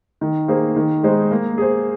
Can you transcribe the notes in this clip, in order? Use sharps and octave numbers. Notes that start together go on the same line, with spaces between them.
D#3
A#3 G#4 C5
D#3
G#3 D#4 G#4 C5
A#3
G#4 C5